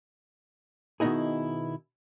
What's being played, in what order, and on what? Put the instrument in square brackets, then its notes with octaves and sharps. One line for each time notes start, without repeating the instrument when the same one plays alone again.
[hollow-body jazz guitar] B2 D#3 B3 D#4 E4 G#4